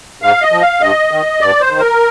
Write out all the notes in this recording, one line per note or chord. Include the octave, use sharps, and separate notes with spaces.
G#2 F5
D#5
F3
F5
G2 D#5
D#3
G2 D5
C5
D#3
A#4